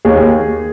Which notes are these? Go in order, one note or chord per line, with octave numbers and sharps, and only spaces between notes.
D#2 G#4